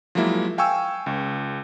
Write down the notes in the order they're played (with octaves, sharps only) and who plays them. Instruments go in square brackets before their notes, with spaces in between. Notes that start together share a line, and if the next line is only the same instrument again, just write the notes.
[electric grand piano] F3 F#3 G#3 A#3 E4
F5 G5 G#5 C#6 E6
C#2